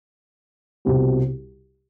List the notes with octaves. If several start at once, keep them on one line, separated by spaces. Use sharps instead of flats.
C2 B2 G3 C4 F#4